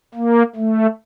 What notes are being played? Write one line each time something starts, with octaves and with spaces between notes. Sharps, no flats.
A#3
A3